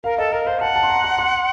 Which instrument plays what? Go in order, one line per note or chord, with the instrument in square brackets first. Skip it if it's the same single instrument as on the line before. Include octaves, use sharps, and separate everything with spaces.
[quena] A#4 [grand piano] F5
[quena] A4 [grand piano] D#5
[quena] A#4 [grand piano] F5
[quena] C5 [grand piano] F5
[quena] F#5 [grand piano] A5
[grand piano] A5
C6
A#5
C6
C6